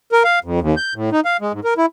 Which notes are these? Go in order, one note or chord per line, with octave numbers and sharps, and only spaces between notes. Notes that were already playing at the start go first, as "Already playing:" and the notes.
A#4
F5
F2
D#2
G6
A2
D#4
F5
G#3
G#2
A#4
E4